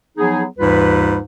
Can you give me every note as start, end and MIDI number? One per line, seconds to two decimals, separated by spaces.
0.18 0.43 53
0.18 0.43 54
0.18 0.43 59
0.18 0.43 63
0.18 0.43 68
0.58 1.18 39
0.58 1.18 44
0.58 1.18 52
0.58 1.18 55
0.58 1.18 65
0.58 1.18 71